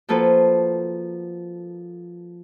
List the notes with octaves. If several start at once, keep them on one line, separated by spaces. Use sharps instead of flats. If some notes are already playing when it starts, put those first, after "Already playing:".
F3 A#3 F#4 A4 B4 C5